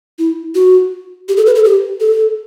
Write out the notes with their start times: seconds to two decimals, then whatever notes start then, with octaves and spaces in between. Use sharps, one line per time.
0.19 E4
0.55 F#4
1.29 G4
1.37 A4
1.46 B4
1.55 A4
1.65 G4
2.00 A4